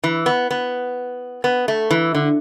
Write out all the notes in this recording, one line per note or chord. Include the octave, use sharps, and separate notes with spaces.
E3
B3
B3
B3
A3
E3
D3